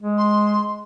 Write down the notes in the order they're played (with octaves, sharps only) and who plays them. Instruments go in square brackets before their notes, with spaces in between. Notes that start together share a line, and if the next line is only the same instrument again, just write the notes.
[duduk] G#3
[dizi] C6